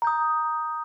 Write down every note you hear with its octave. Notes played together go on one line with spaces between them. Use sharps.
A#5 D#6 G6